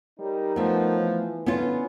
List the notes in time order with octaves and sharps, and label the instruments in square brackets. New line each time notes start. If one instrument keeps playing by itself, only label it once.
[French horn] G3 [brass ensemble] D#4 A#4 C#5
[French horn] F3 [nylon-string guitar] A3 B3
[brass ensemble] E3
[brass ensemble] D3 D4 G#5 [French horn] E3 [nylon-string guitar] B3 C#4 F4